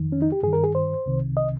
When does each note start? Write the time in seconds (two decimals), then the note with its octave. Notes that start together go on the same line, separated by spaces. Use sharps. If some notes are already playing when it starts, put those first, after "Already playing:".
Already playing: F2 D#3
0.12 C#4
0.22 D#4
0.32 G4
0.43 G2 D#3 G#4
0.53 A#4
0.63 G#4
0.75 C5
1.06 C2 C3 D#3
1.37 D#5